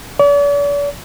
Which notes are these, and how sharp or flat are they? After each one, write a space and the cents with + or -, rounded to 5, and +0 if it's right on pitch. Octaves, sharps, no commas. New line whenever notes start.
D5 -45